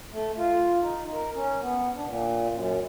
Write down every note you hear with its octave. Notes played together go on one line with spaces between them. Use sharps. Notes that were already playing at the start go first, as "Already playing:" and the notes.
A3
F4
D#4
A#4
C#4
B3
D4
A#2
F#2